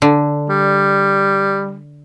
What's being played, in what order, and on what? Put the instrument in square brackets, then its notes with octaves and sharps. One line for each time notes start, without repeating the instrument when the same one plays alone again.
[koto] D3
[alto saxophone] G3